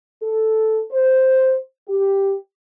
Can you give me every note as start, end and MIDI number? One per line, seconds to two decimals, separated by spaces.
0.23 0.81 69
0.91 1.55 72
1.88 2.35 67